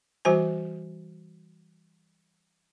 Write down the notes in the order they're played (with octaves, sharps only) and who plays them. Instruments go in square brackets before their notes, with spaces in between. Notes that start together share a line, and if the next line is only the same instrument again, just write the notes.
[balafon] E3 G3 F#4 C5 G#5